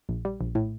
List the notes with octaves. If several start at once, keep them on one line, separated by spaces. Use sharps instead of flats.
A#1
G3
A#1
A2